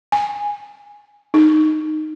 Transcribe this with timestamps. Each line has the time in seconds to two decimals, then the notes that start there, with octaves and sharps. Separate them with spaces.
0.12 G#5
1.34 D#4